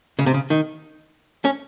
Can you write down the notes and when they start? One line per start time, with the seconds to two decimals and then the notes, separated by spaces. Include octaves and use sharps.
0.19 C#3
0.26 C3
0.34 C#3
0.50 D#3
1.45 C#4